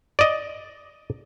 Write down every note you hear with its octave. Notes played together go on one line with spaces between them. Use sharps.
D5 D#5